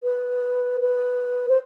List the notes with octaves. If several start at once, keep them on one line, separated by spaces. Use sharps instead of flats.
B4
B4
C5